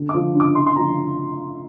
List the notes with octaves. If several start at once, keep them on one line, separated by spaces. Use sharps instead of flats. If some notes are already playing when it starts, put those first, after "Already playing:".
Already playing: D3
D6
F3
D4
D6
E4 C6
C6
F3 A#5